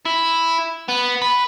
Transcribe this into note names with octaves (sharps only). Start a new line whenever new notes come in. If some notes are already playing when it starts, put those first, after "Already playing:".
E4
B3
B4